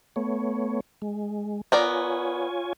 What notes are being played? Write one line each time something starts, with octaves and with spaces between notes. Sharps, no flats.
A3 B3 C#5
G#3
B3 F4 A#4 C#5 D5 G#5